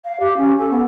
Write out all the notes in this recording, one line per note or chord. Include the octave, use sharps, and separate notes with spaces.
F5
G4
C#4
A4
B3